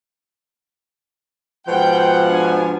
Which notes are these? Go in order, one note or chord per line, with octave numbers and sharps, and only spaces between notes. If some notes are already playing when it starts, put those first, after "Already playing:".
G#2 B2 F3 F#5 G5 G6
D4 G#5